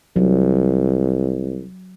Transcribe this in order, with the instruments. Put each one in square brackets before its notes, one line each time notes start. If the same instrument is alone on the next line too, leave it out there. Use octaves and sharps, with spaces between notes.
[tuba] C2 [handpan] F#3